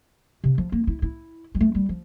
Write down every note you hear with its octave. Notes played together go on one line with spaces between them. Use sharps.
C3
F3
A#3
E4
E4
G3
A3
G3
F3